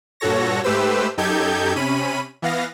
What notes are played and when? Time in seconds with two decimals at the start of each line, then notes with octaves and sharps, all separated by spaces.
0.20 G2 A#2 F#4 A4 C#5 A#6
0.64 G#2 A3 G4 B4 C5 E6
1.17 F#2 D#4 G4 A4 G6 G#6
1.76 C3 C#4 B5 D#7
2.42 E3 B3 F5 A#6